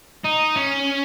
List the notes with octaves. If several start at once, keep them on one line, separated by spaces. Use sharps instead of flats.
D#4
C#4